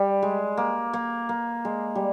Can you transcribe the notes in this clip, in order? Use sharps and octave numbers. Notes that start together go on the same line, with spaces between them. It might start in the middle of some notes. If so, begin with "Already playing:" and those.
Already playing: G3
G#3
A#3
A#3
A#3
G#3
G3